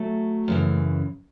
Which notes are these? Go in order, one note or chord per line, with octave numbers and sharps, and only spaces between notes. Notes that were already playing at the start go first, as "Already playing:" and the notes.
Already playing: F#3 A3
F#2 C#3 E3